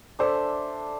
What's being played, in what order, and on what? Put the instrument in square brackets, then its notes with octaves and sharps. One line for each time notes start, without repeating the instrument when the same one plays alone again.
[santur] D4 A4 E5 [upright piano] C5